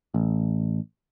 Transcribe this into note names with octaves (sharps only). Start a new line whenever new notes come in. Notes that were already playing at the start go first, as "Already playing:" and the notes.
A1